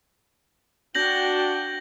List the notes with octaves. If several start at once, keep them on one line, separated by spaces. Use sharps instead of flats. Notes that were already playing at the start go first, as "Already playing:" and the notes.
D4 F#4 G5 G6 A#6 F#7